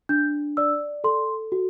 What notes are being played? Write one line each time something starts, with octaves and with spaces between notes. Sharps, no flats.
D4 G6
D5 E6
A4 C6
F#4